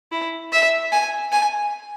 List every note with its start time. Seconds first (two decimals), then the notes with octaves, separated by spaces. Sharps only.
0.12 E4
0.52 E5
0.92 G#5
1.32 G#5